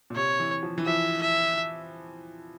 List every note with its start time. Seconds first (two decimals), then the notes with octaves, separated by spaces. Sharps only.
0.10 A#2
0.16 C3 C#5
0.40 E3
0.63 F3
0.78 E3
0.86 F3 E5
1.22 E5